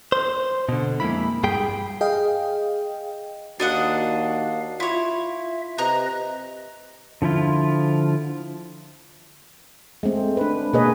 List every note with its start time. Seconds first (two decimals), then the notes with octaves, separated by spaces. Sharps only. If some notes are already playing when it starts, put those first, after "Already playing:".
0.12 C5
0.69 B2 D3
1.00 F2 G#3 A#3 E4 B5
1.43 G2 G#4 G5 B5
2.01 G#4 D#5 F5 G5
3.60 D#2 D4 F#4 D#5 F5 F#5
4.80 E4 F4 C#5 E5 C6
5.78 C3 B4 D#5 A#5 F#6
7.22 D3 F3 E4 F4
10.03 G#3 A3 C4
10.37 D4 B4
10.73 B2 A#3 G#4 B4 C#5 D#5